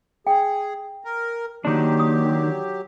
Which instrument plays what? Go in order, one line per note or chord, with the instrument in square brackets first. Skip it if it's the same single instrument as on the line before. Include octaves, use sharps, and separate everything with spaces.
[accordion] G#4 [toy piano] G5
[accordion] A#4
[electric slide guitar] D#3 D4 [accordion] F#3 G4 [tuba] A#3
[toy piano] D#6